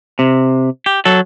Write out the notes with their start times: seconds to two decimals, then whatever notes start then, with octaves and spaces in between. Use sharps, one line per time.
0.19 C3
0.86 G4
1.05 F#3 A4